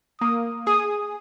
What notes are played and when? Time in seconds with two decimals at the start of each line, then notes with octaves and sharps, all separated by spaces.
0.21 A#3 D#6
0.67 G#4 D#6